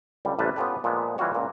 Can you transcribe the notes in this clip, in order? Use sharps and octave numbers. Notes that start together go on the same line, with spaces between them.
C#2 D3 G3
A1 C3 G3 B4 A5
B3 C#4 F4 G4 A4 B4
A#2 F3 G#3 B3
E3 G3 A#3 F4 F#4 C#5
C#2 A#2